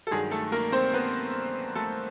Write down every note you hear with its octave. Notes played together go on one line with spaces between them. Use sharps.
A4
G2 D#3 F#3 G#3 G#4
A3 A4
A#3 A#4
C4 C5
B3 B4
A3 A4